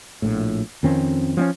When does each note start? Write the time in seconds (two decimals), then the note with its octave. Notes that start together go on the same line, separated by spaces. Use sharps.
0.22 A#1 A2
0.83 F2 D#3 C4 C#4
1.37 F3 C4 C#4